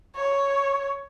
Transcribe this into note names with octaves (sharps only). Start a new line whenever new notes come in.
C#5